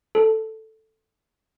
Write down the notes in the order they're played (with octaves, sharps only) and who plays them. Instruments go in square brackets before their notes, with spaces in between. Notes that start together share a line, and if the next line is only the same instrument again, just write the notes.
[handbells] A4